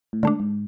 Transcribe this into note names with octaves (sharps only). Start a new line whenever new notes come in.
A2
G#2 D3 A3 D4
G#2